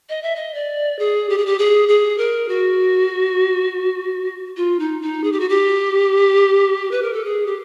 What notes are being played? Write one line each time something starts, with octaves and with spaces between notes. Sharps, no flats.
D#5
E5
D#5
D5
G#4
G4
G#4
G4
G#4
G#4
A#4
F#4
F4
D#4
D#4
G#4
G4
F#4
G4
B4
A#4
A4
G#4
G4